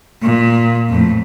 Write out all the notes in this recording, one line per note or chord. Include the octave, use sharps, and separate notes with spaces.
A#2
F2 A2